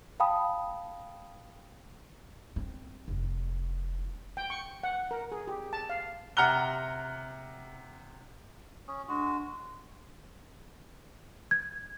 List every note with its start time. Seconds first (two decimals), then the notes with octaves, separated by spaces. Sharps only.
0.20 F5 G5 A5 B5 D#6
2.56 C4
3.08 F1
4.37 G5
4.50 C#6
4.83 F#5
5.11 A#4
5.32 G#4
5.48 G4
5.73 A5
5.90 F5
6.37 C3 F#5 A#5 F6 F#6 G7
8.88 C#4 D#6
9.08 G#3 D4 F#4
11.51 G#6